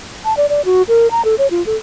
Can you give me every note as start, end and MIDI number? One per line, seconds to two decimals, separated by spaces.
0.25 0.36 81
0.37 0.46 74
0.49 0.64 74
0.65 0.82 66
0.88 1.10 70
1.11 1.24 82
1.25 1.35 69
1.38 1.50 73
1.51 1.64 65
1.66 1.75 69